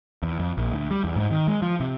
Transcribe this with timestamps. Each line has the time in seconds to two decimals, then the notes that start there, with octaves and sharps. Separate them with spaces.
0.23 E2
0.39 F2
0.57 A#1
0.72 D2
0.91 G3
1.04 E2
1.16 G#2
1.31 D#3
1.48 G#3
1.62 F3
1.80 C3